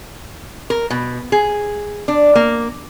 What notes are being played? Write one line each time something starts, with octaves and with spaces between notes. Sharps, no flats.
A#4
B2
G#4
D4
A#3